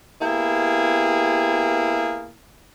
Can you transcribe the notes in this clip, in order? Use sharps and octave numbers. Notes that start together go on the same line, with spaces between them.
A#3 B3 E4 G4 G#4